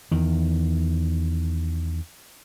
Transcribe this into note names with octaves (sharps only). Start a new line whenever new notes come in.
E2 D#3